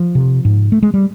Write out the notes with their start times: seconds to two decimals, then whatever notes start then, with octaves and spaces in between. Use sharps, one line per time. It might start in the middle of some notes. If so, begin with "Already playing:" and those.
Already playing: F3
0.15 C3
0.45 G#2
0.72 A3
0.83 G#3
0.94 G3